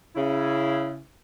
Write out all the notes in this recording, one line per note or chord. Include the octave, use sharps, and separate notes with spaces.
C#3 E4